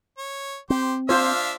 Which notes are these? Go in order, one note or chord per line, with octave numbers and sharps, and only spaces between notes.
C#5
C4 G4 C5
D4 F4 C5 E5 F5